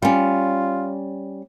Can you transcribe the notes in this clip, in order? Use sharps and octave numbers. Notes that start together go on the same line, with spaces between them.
G3 C#4 F4